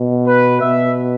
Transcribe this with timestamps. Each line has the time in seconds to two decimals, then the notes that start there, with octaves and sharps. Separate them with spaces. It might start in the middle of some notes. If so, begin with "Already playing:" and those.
Already playing: B2
0.27 B4
0.61 B2 E5